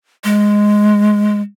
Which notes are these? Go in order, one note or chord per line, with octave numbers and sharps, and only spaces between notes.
G#3